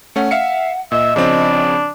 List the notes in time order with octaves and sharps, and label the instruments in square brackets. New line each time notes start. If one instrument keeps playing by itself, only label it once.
[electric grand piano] A3 C#4 [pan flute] F#5
[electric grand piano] E5 F5 C#7
[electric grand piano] A#2 [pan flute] D#5 [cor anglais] E5
[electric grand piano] C#3 F3 C4 [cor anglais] D4